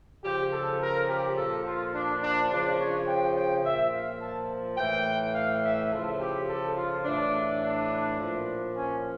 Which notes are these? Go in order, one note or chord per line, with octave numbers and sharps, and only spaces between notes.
C#3 F3 G4
A4
A#4
G4
A#2 F3 A4
F4
D4
D4
C#3 F3 D4
C#5
G5
G5
A#2 F3 E5
F5
A5
A2 E3 G5
F5
E5
C#3 F3 A4
G4
A4
F4
A2 E3 D4
D4
A#2 F3
C#4